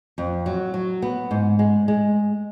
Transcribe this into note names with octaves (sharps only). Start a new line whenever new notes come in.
F2
F#3
F#3
B3
G#2
G#3
G#3